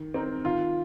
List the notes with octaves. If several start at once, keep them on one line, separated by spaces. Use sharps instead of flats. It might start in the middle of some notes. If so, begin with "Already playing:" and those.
Already playing: D#3
C4 D#4 A#4
D#3 F4